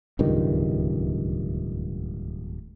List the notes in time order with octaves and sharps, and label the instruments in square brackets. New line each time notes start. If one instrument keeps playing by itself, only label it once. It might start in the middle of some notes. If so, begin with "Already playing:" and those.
[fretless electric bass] D1 C#2 G2 D#3